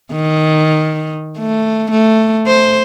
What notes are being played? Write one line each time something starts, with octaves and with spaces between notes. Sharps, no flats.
D#3
A3
A3
C5